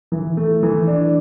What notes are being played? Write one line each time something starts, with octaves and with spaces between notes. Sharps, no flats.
E3
A3
E3
D4